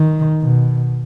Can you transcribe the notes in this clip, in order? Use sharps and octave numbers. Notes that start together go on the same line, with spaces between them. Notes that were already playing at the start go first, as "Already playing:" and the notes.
Already playing: D#3
B2